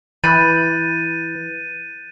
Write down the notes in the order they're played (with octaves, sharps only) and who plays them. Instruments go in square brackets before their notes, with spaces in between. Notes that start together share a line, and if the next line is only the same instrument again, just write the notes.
[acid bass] E3 [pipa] B5 [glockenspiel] F#6 G6 A6 [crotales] D#7